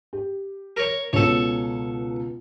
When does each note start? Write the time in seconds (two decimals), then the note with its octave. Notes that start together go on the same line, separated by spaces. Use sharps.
0.13 G4
0.77 A#4 C#5
1.13 C#2 B2 A4 C#5